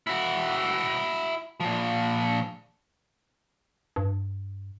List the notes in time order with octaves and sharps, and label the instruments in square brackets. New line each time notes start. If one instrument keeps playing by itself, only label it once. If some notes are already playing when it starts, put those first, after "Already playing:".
[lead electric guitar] E4 F#4
A#2 F3
[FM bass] G2